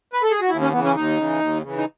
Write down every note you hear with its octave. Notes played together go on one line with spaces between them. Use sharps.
B4
A4
G#4
F#4
D#2 E4
C#4
C#3 E3 B3
C#4
D#2 D#4
C#3 E3
D#2
C#3 E3
D#4